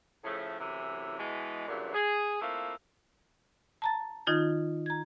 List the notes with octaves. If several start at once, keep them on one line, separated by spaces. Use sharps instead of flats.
A2 C#3 F3 A3
F#2 A2 C3 E3
B2 E3 G#3
G2 A#2 C#3 E3 F#3
G#4
A3 A#3 C4 E4 F4
A5 A#5 A6
D#3 D#4 F4 G#6 A6
A#5 G#6